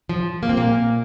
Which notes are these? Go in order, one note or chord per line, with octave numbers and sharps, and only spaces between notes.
F3
A#3
C4
A#2 A#3